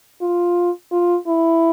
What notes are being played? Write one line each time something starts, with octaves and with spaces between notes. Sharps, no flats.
F4
F4
E4